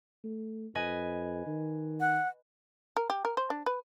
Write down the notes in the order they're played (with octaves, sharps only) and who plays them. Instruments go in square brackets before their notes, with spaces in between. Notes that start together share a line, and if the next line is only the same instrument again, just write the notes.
[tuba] A3
[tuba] F2 [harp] B4 D#5 G#5
[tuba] D#3
[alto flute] F#5
[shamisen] A#4
G4
A#4
C5
D4
B4